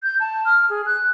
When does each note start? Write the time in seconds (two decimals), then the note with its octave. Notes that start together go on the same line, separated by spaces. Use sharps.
0.03 G6
0.20 A5
0.45 F6
0.70 G#4
0.86 F#6